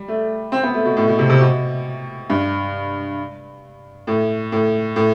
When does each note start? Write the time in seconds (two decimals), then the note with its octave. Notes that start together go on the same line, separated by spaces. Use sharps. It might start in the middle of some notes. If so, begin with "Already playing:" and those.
Already playing: G3
0.08 A3
0.52 C4
0.63 B3
0.74 A3
0.85 B2
0.97 A2
1.08 B2
1.19 C3
1.29 C3
1.41 B2
2.30 G2
4.07 A2
4.52 A2
4.96 A2